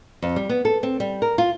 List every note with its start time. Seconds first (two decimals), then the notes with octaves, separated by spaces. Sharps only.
0.22 F2
0.36 G3
0.49 B3
0.65 A4
0.83 C4
1.00 G3
1.22 A#4
1.38 F4